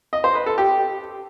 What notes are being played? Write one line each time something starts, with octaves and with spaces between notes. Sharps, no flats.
D#5
C5
B4
A4
G4